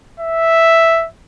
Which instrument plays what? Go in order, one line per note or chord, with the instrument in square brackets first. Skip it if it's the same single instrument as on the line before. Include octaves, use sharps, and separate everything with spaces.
[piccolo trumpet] E5